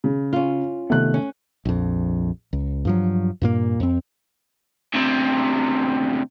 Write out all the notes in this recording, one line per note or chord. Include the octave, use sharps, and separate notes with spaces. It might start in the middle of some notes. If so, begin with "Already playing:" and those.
C#3
C#4 F4
C3 D#3 A3 B3 F#6
C#4
A#1 F2
C#2
G2 F3 F#3
G2 A#2 A#3
F2 C4
D2 C3